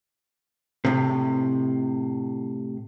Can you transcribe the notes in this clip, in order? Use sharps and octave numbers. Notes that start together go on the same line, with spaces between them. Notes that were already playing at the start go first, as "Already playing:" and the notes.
A2 C3